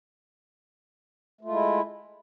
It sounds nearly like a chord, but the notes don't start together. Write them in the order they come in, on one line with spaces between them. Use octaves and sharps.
A3 F4 G#3 E4